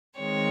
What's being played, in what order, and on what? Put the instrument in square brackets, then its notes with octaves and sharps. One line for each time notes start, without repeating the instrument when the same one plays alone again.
[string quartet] D#3 G#3 C4 C#5